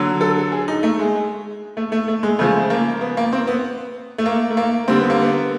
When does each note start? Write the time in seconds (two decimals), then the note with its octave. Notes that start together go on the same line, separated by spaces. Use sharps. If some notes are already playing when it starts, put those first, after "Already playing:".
Already playing: D3 F#3
0.21 A4
0.52 G#4
0.68 D#4
0.83 A3
0.99 G#3
1.77 A3
1.92 A3
2.08 A3
2.23 G#3
2.39 C#3 F3 G#3 A3
2.70 A#3
3.01 B3
3.17 A#3
3.33 C4
3.47 B3
4.18 A3
4.26 A#3
4.50 A3
4.57 A#3
4.88 D3 G3 C4
4.99 B3
5.10 A#3
5.21 B3